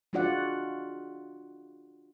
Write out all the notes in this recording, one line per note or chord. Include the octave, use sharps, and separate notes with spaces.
G#3 D4 F4 F#4 D5 F#5